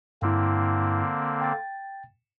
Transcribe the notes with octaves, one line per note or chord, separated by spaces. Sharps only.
G2 D3 A#3 C4 E4
G5 A6